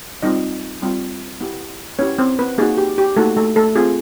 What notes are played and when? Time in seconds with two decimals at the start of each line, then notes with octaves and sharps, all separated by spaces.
0.22 G3 C4 D#4 F4 D#5
0.82 G3 C4 F4
1.41 B3 E4 G4
1.99 B3 C#4 E4 G4 C#5
2.19 C4 C5
2.39 B3 B4
2.58 A#3 D#4 F#4 G#4
2.78 G4
2.98 G4
3.17 A3 A#3 D#4 F#4 A4
3.37 A3 A4
3.56 A3 A4
3.76 C4 F4 G#4